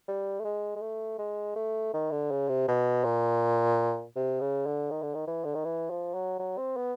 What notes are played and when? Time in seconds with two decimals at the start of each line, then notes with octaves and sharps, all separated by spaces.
0.08 G3
0.40 A3
0.45 G#3
0.76 G#3
0.81 A3
1.19 G#3
1.56 A3
1.94 D#3
2.11 D3
2.31 C#3
2.49 C3
2.68 B2
3.04 A#2
4.16 C3
4.41 C#3
4.66 D3
4.91 D#3
5.03 D3
5.15 D#3
5.27 E3
5.45 D3
5.55 D#3
5.65 E3
5.90 F3
6.14 F#3
6.39 F#3
6.58 C4
6.77 B3